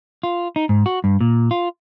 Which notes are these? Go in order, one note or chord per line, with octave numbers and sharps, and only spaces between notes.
F4
D#4
G#2
F#4
G2
A#2
F4